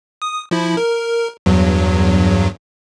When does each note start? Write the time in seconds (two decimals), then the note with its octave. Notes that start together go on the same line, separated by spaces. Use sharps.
0.22 D#6
0.51 F3 E4
0.77 A#4
1.46 E2 G2 F#3